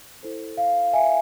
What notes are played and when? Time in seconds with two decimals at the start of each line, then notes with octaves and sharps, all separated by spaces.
0.23 E4 A4 C5
0.58 F5
0.93 E5 G#5